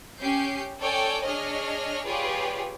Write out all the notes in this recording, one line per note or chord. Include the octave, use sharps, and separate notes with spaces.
C#4 G4 G6 C7
A4 C#5 D5 G5 G#5
D4 G#4 C#5 D#5 F6
F4 G4 G#4 B4 C#5 D5